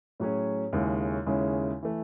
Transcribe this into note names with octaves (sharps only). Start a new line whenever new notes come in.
A2 F#3 C#4 G#4
D#2 C#3 G#3 C#4 E4
D#2 C#3 G#3 C#4 E4
E3 A3